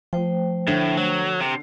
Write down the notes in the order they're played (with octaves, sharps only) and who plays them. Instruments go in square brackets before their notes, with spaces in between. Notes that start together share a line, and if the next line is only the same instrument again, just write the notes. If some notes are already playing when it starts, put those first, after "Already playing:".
[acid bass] F3 [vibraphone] A3 C5 G5
[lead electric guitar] A2 [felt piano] D3
[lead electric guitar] F#3
C3